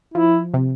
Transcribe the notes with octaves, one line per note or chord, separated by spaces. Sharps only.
F3 E4
C3